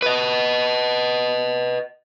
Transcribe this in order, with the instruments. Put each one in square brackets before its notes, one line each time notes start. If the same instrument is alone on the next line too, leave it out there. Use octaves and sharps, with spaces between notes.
[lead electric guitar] B4 D#5